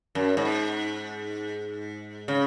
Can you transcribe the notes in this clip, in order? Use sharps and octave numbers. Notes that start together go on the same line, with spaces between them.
F#2
G#2
C#3